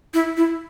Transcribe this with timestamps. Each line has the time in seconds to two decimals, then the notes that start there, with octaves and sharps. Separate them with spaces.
0.14 E4
0.37 E4